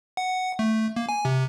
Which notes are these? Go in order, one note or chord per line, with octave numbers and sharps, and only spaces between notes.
F#5
A3
A#3
G#5
C3